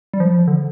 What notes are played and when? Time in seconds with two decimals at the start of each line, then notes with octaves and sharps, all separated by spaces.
0.14 G3
0.20 F3
0.48 D3